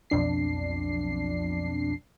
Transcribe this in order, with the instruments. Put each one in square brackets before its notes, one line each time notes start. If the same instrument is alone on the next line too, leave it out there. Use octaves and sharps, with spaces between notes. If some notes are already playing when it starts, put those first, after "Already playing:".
[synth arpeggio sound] B1 F2 D4 C7